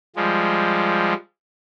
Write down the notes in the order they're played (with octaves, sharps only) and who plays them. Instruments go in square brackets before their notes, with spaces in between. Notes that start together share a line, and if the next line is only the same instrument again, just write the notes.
[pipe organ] F3 G3 G#3